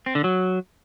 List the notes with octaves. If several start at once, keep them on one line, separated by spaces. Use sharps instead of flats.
C4
D3
F#3